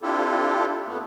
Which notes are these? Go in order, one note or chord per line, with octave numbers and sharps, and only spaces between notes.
C4 D4 E4 F4 G4 A4
F2 A3 B3